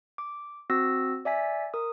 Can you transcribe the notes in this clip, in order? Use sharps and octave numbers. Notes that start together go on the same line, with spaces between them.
D6
C4 F#4 E6 A#6
D5 E5 G#5 B6
A#4 D#6